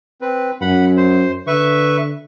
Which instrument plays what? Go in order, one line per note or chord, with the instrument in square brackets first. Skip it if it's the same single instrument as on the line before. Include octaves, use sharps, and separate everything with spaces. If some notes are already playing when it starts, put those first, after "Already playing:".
[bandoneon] C4 B4
[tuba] F#2 [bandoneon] F#5 B5
[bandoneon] C5
[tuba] D3 [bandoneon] B4 E5 C#6